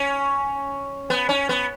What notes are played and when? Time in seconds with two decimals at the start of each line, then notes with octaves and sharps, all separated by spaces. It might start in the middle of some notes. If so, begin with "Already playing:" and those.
Already playing: C#4
1.10 B3
1.29 C#4
1.49 B3